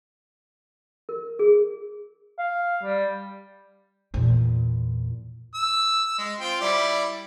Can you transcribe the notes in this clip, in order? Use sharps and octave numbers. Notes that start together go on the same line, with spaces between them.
A#4
G#4
F5
G3
E2 A#2
E6
G#3
C4 F4 G5
G3 E4 D5